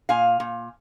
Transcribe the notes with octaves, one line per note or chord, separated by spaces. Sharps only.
A#2 F5 G#5
A#2